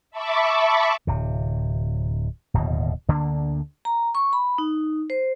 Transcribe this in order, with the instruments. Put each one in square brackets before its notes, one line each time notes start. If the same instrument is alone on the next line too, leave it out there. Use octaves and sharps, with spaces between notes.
[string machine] E5 A5 B5 C#6 D6
[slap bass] D1 C3
D1 D#2 B2
D2 D3 A#3 D4
[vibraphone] A#5
C#6
B5
D#4
C5